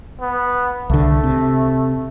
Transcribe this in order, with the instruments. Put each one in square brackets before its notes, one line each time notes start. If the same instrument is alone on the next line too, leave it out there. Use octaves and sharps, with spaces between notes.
[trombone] B3
[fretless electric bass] C2 D3 [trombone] A3
[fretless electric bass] C3